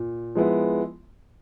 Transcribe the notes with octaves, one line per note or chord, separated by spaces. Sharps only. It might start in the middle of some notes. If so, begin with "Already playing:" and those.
Already playing: A#2
F3 G#3 B3 E4